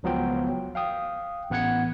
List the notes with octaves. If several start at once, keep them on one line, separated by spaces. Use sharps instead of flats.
C#2 F3 F#3 B3 F4 G5
F5 G5 D#6
A1 B3 F#5 F#6 G#6 C#7